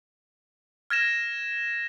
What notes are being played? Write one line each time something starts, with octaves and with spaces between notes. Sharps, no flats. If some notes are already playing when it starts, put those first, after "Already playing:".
F6 G#6 A#6 E7